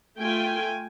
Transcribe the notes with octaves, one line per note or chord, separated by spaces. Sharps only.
A3 F4 G5 G#5